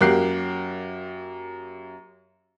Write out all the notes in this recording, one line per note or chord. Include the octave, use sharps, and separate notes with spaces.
F#2 A#3 G4 A#4 F#6 C7